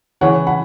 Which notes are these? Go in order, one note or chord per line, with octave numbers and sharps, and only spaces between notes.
C#2 C#3 E3 C#5 F#5
F#5 B5